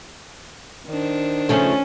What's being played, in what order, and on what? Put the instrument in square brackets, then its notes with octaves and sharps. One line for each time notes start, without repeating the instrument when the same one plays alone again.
[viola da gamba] D#3 D4 C5
[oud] C#3 F3 A3 [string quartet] C#4